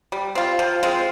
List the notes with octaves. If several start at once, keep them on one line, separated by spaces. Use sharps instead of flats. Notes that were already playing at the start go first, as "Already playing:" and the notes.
G3
C4 F4
F3
G#3 C4 F4